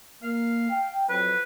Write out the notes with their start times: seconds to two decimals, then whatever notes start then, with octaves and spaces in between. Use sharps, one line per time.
0.23 A#3 F5
0.70 G5
1.09 F2 F#3 B4